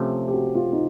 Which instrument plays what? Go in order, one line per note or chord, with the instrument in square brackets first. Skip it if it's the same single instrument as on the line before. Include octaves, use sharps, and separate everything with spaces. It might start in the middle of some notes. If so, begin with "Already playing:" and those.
Already playing: [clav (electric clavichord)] C3 F3 A3 C#4 [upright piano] G4
[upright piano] G4
F#4
F4
D#4